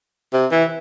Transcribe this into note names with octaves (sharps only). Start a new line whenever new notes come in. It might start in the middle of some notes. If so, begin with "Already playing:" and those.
C3
E3